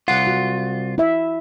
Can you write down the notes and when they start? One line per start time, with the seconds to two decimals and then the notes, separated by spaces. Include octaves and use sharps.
0.08 C2 F4 F#5
0.27 F#4
0.98 E4 E5